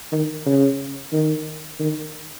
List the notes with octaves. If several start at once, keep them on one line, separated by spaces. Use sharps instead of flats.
D#3
C#3
D#3
D#3